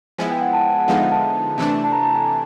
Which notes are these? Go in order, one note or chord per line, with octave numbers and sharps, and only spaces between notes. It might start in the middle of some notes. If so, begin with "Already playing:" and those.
F3 G#3 B3 E4 G#5
G5
F#5
A5
G#5
F#5
D3 F3 G#3 B3 D#4 F5
E5
A5
C3 E3 A3 D4
A5
A#5
A5
G#5